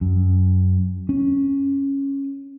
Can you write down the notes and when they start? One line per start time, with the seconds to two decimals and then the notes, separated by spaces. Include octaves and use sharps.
0.01 F#2
1.09 C#4